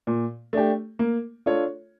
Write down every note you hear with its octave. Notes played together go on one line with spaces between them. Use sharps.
A#2
A3 D4 G4
A#3
D4 F4 A4 C#5